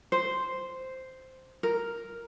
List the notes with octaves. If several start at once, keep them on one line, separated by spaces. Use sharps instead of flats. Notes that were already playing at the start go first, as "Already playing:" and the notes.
C5
A#4